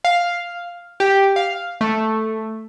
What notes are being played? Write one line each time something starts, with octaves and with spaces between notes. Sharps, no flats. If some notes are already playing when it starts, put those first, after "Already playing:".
F5
G4
F5
A3